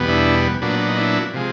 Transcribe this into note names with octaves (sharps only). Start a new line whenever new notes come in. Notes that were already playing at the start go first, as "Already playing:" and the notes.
Already playing: E2 B2 G3 B3
D4 E4
A#2 F#3 B3 D4
D4
D#4
D4 E4
C3 F3 G#3